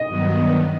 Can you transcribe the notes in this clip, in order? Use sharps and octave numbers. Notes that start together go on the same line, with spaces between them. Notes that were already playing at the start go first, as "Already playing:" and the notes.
Already playing: D#5
G2 D#3 F#3 B3